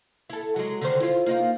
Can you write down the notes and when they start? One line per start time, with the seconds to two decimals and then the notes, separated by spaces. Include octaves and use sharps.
0.30 E4 A4
0.56 F#3 G#3
0.81 D3 D#3 C5
1.00 E4 F4
1.26 A#3 D#4 F4